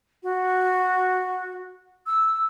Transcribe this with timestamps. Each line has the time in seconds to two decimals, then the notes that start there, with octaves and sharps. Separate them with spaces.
0.23 F#4
2.06 E6